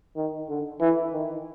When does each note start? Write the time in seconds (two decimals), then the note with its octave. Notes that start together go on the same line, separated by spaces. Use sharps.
0.17 D#3
0.49 D3
0.80 E3
1.13 D#3